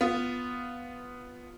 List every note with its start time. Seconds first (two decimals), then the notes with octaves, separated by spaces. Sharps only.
0.01 B3 F4